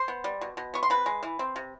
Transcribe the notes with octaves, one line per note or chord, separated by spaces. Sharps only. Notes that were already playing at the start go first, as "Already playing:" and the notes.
Already playing: C5 C6
B3
G3
B2
B2
B3 C#6
C6
C3 B4 B5
G#3
E3
C4
C3